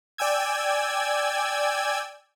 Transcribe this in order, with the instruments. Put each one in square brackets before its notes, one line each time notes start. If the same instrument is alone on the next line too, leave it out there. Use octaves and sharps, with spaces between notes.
[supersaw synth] D5 G5 G#5 E6 G#6